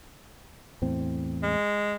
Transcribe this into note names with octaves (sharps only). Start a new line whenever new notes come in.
E2 A2 C4
G#3